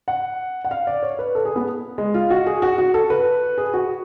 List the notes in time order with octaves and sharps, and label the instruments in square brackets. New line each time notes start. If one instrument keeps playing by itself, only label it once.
[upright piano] F#5
F#5
F5
D5
C#5
B4
A4
G#4
B3
G#3
F4
F#4
G#4
F#4
F#4
A4
B4
G#4
F#4